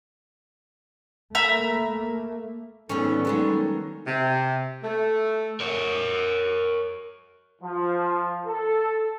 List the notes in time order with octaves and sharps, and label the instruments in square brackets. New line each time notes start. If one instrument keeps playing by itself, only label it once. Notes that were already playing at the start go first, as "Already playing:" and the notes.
[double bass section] A3 A#3 [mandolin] E5 A#5 B5
[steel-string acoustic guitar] G#2 D#3 F#3 [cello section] G3 B3 [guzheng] C#4 [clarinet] A4
[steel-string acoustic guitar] D#3 F#3 G#3
[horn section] C3
A3
[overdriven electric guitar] A#4 C#5
[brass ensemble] F3
A4